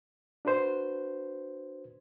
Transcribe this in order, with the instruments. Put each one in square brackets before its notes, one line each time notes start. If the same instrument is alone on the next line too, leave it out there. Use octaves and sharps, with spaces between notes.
[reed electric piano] D4 F#4 B4 C5